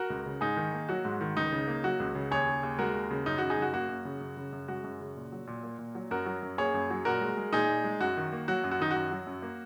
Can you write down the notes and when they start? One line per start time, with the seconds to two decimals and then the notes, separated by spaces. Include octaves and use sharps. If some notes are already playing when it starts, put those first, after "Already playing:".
Already playing: F#4 A#4
0.10 C#2
0.26 C#3
0.41 G#2 D#4 G#4
0.57 D#3
0.73 A#3
0.89 F#3 F#4
1.05 G#2
1.21 D#3
1.36 C#2 D#4
1.52 C#3
1.68 A#3
1.84 F#3 F#4
2.00 C#2
2.15 C#3
2.31 D#2 G#4 C#5
2.48 C#3
2.63 D#2
2.79 G#3 F#4 A#4
2.94 D#2
3.11 C#3
3.26 F#2 D#4
3.38 C#3 F#4
3.50 D#4 G#4
3.58 F#2 F#4
3.73 A#3 F#4
3.89 F#2
4.05 C#3
4.21 F#2
4.37 C#3
4.52 F#2
4.68 G#3 F#4
4.84 F#2
5.00 C#3
5.16 A#2
5.32 F#3
5.47 A#2
5.63 A#3
5.79 A#2
5.95 F#3
6.11 F#2 F#4 A#4
6.26 F#3
6.43 F#2
6.58 A#3 G#4 C#5
6.74 F#2
6.90 F#3
7.05 A#2 F#4 A#4
7.21 G#3
7.37 G#3
7.53 A#2 D#4 G#4
7.69 A#2
7.84 G#3
8.00 F#2 F#4
8.17 D#3
8.32 A#3
8.48 F#3 F#4
8.64 F#2
8.71 F#4
8.80 D#3 D#4
8.91 F#4
8.96 F#2
9.11 F#3
9.27 F#2
9.42 A#3